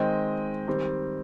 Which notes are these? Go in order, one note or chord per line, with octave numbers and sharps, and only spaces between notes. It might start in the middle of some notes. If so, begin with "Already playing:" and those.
Already playing: D#3 G#3 C4 D#5 G5
D#3 G3 C4